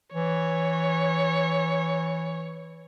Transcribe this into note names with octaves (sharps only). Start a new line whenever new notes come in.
E3 C#5